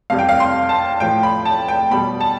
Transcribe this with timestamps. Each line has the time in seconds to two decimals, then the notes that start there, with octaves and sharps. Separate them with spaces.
0.10 F2 C3 G3 F5
0.19 G5
0.29 F5
0.40 C6
0.69 A5
1.00 A2 F3 G5
1.23 B5
1.45 A5
1.68 G5
1.91 B2 G3 B5
2.20 A5